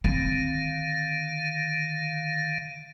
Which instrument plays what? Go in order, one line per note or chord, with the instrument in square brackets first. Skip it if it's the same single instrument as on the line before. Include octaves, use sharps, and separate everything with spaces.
[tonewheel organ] D3 D#3 F5 [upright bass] C4